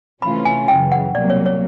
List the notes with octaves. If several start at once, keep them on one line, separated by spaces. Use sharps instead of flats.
C3 E3 A3 C#4 F4 B5
G#5
F#2 C#3 E3 G5
F#5
C2 B2 F#3 A#3 D5
C#5
C#5